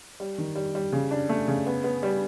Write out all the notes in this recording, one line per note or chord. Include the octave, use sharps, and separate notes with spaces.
G3
D#3
G3
G3
C#3
D4
A3
C#3
B3
B3
G3